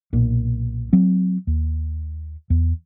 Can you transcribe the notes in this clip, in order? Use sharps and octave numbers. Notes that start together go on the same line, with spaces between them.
B1 A#2
F#3 C4
D#2
E2